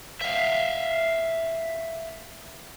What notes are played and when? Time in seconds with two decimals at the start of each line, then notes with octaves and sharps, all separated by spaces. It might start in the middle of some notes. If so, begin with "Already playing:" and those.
0.21 E5 F5